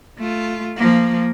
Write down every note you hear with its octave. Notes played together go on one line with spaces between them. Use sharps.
A3 F4
F3 A#3